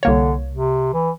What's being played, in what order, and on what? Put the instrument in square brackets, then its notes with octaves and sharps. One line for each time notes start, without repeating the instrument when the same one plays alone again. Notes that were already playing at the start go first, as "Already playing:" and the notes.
[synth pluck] C2 A#3 C#5 [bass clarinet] D3
[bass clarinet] C3
E3